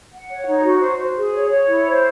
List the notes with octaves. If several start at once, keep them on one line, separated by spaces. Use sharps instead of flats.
F#5
C#5
D#4
F#4
C5
C5
G#4
C#5
C#5
E4
C5